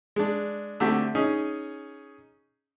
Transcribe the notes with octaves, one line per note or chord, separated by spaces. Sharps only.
G#3 D4
D3 A3 C4 F#4 G4
C#4 D#4 G#4